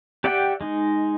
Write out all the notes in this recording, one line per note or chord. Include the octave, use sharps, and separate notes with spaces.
G4 D5 E5 F#5 G5
G#3 D#4